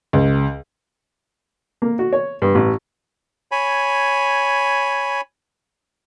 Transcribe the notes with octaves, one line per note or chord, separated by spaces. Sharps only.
C#2
A#3
F#4
C#5
G2
A1
C#5 G#5 B5